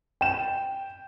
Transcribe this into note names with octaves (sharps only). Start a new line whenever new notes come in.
G5 E7